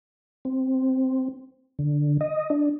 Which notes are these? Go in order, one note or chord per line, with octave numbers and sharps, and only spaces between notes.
C4
D3
D#5
D4